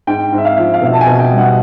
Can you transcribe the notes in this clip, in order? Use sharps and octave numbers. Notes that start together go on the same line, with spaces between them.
G#2 G5
G#2
E5
F5
F3
F5
B2 E5
A5
G#5
B2
G#5
G5
G3
F#5